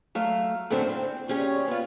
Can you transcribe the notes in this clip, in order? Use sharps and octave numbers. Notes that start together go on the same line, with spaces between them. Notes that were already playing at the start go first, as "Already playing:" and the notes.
F#3 A3 F5
F#2 A2 D3 C4 D4
C4
D2 A#2 C#4 G4 G#4 C#5
B3 F4